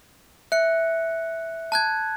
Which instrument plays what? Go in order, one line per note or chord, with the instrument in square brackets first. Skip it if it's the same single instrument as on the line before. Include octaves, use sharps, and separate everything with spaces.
[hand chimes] E5 [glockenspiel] F#6 C#7
[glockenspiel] A5 F#6 G#6